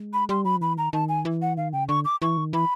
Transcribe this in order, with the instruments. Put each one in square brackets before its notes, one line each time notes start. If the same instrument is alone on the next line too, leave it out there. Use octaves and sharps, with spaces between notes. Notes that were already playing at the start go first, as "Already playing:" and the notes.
Already playing: [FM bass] G#3
[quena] B5
[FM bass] G3 [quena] C6
[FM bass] F#3 [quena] B5
[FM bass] F3
[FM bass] E3 [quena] B5
[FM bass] D#3 [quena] A#5
[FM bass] D#3 [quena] A5
[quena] G#5
[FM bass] E3
[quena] F#5
[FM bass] D#3 [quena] F5
[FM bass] C#3 [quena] G5
[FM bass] D3 [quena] C#6
[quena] D6
[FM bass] E3 [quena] C#6
[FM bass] D#3
[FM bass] E3 [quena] B5